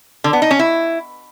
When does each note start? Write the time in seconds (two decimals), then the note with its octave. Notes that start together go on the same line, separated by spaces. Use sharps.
0.24 D3
0.33 B3
0.42 D#4
0.51 C#4
0.59 E4